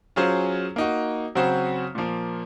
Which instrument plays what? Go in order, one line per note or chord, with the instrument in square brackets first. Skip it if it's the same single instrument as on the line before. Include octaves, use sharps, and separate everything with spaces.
[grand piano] F#3 C#4 F4 G#4 C5
A#3 D#4 F#4
C#3 F#3 C4 F#4 C5
A#2 F3 A#3